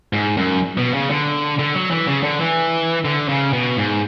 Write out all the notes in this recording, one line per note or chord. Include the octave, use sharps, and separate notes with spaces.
G#2
F#2
B2
C#3
D3
D3
F#3
E3
C#3
D3
E3
D3
C#3
B2
G#2